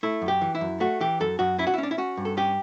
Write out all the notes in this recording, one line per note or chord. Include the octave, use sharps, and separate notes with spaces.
A3 E4
F#2
G4
E3
E4
F#2
A3 F#4
E3 G4
F#2 A4
F#2 F#4
C#4 E4
F#4
E4
C#4
D4
E4
C#4 F#4
G2
A4
C#4 G4